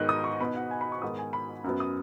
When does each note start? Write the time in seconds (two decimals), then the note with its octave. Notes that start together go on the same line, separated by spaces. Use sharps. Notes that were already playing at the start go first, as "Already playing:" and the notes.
Already playing: G#2 D#3 B3 D#4 F#6
0.09 D#6
0.24 C#6
0.40 B2 B3 D#4 B5
0.56 F#5
0.71 G#5
0.81 B5
0.92 C#6
1.02 G#2 D#3 B3 D#6
1.19 G#5
1.33 B5
1.64 F#2 F#3 B3
1.80 D#6